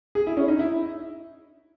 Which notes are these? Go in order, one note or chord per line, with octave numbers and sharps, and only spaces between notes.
G#4
E4
C#4
D#4
E4